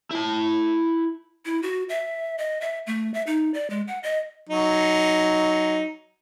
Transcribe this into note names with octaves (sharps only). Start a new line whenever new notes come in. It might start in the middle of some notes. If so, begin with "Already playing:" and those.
E4 A5
E4
F#4
E5
D#5
E5
A3
E5
D#4
D5
G#3
F#5
D#5
F#3 D#4